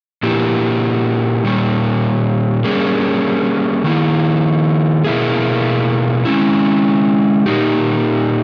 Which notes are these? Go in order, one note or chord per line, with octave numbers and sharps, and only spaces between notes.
A#2 A#3 E4 G4
A#2 G3 A#3
G3 A#3 C#4 G#4
D#3 A#3 E4
B2 A#3 E4 G#4
G#3 C#4 E4
A#2 A#3 D#4 G4